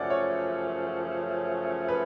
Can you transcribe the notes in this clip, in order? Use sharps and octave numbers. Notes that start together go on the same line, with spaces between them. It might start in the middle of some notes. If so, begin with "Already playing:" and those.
Already playing: F#2 C#3 F3 A3 C#4 D5 F#5
C#5
B4